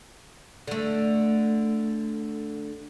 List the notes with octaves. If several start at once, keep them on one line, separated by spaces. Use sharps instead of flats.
D3 A3